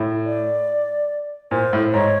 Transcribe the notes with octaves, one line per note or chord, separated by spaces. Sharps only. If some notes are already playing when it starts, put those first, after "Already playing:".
Already playing: A2
D5
A#2 C5
A2
G#2 C#5